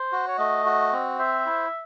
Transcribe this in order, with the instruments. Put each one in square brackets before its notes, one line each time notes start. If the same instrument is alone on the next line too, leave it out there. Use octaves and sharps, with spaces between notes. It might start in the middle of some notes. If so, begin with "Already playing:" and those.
Already playing: [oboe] C5
[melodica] F#4
[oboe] C#5
[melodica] A3 [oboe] D#5
[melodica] F#4
C4
[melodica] C5 [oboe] E5
[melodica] E4